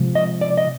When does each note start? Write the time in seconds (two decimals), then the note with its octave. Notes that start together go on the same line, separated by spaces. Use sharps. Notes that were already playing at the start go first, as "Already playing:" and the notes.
Already playing: C3 F3 G#3
0.15 D#5
0.41 D5
0.58 D#5